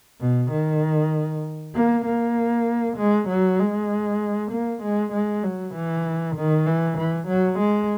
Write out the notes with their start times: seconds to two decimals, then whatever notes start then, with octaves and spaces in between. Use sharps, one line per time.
0.21 B2
0.51 D#3
1.74 A#3
2.05 A#3
2.98 G#3
3.28 F#3
3.59 G#3
4.51 A#3
4.82 G#3
5.12 G#3
5.43 F#3
5.74 E3
6.36 D#3
6.66 E3
6.97 E3
7.28 F#3
7.59 G#3